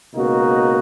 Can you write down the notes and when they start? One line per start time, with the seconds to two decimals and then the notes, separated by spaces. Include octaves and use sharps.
0.15 C#2 B2 A#3 D#4 F#4